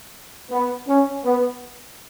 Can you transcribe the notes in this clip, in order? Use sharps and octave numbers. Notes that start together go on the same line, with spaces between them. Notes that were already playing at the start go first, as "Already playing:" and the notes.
B3
C#4
B3